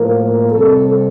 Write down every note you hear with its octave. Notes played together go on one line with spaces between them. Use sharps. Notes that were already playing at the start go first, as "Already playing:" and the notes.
Already playing: A2 F3 A#3 A#4
C3 G3 C4 A4